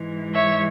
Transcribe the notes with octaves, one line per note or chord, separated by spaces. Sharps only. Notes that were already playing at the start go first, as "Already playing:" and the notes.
Already playing: G#2 E3 G#3
C#5 E5